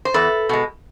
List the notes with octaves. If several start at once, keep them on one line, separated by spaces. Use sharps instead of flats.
C5
E2 A4 B4
B2 G#3